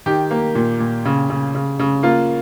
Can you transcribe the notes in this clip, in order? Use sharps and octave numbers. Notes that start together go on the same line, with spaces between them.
D#3 G4
A#3
A#2
A#2
C#3
C#3
C#3
C#3
A#3 F4